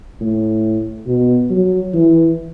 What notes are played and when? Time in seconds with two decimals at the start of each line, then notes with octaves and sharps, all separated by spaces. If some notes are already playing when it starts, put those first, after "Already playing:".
0.21 A2
1.07 B2
1.50 F#3
1.93 E3